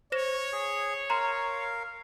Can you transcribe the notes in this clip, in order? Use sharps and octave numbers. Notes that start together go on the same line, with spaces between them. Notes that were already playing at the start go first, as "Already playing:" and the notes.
C5 C#5 A#6 E7
G#4
A#4 F5 A#5 C6